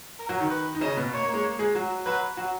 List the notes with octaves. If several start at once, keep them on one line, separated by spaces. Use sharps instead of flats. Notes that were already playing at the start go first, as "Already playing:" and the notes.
A#4
F#3 F#4
D#3 D#4
B4
D#4
C#3 C#4 D#5
B2 B3
A#3 C#5
A#3
G#3
A#3
G#3 G#4
F#3 F#4
F#3 F#4 B4
F#3 F#4